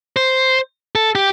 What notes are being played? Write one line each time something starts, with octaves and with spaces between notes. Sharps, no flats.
C5
A4
G4